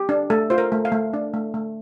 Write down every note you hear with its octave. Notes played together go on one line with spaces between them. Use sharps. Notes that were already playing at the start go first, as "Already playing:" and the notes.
Already playing: G4
D4
A3 A4
F4 C5
A#4
A3
F5
A3
D4
A3
A3